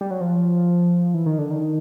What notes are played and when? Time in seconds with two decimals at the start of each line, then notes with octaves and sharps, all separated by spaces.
0.01 G3
0.11 F#3
0.21 F3
1.14 E3
1.26 D#3
1.38 D3
1.51 D#3